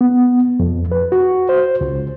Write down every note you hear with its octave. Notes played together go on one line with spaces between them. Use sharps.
B3
F2
B4
F#4
C5
C#2